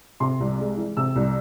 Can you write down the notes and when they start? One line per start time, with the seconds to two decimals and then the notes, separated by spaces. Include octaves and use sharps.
0.20 C3 C6
0.40 C2
0.58 G#3
0.77 E3
0.97 C3 E6
1.16 C2